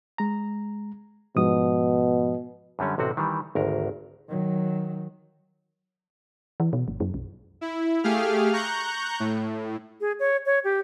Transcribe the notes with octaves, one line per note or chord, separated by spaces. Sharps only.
G#3 A#5
G#2 B2 F3 D#6
F#2 D3 G3 C#4
A1 C3 C4 F#4
D#3 E3 G3
G#1 D2 A#4
D#3 F#3
E3
B2
G1
F#2
B1
E4
A3 G4 G#4 F5 F6
A#5 C#6 F#6 G6
A2
G#4
C#5
C#5
G4